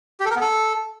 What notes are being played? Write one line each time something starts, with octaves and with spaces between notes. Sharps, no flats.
G4
A4
A#4
B3
A4